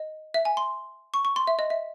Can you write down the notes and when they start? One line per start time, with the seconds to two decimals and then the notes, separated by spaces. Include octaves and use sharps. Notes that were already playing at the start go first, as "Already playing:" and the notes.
Already playing: D#5
0.34 E5
0.45 G#5
0.57 C6
1.14 C#6
1.25 C#6
1.36 C6
1.47 E5
1.59 D#5
1.70 E5